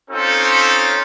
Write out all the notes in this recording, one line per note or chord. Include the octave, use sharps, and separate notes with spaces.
C4 C#4 D#4 F4 A4